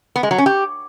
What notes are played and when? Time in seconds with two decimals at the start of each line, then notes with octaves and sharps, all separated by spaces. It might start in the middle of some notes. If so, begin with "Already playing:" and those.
0.16 B3
0.23 G#3
0.31 F#3
0.38 C#4
0.46 G4